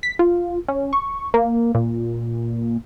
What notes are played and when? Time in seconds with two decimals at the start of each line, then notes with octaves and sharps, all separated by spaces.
0.03 B6
0.19 F4
0.68 C#4
0.93 C#6
1.34 A#3
1.75 A#2